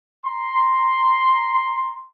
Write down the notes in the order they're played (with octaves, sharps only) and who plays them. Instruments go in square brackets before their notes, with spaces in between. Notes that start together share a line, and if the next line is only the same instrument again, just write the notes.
[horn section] A#5 C6